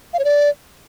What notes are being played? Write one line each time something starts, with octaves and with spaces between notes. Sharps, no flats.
F5
C#5
D5